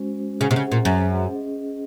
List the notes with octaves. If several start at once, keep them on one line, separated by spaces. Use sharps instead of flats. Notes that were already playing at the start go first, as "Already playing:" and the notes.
Already playing: G#3 C#4 F#4 C5
C#3 C#4 G#4 C5 F#5
C3
C#3
A#2
F#2
C#4 G#4 D#5